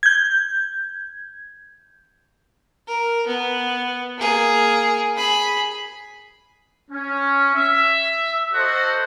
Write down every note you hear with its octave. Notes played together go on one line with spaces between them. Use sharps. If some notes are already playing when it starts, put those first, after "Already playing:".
G6 G#6
A#4
B3
A#3 G#4
G#4 B5
C#4
E5
F#4 A4 C5 D#5 F#5